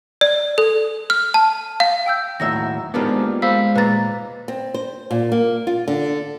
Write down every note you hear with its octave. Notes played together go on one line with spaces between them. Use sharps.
D5
A4
F6
A5
F5
G5 E6 G6
D#2 A2 D#3 F#3 E5 A#6
G#2 G3 A#3 B3 D4 F4
G#3 C5 F5 B5 E6
D#2 A#2 B4 A#5 A6
C4
C5
A#2
A#3
F4
D3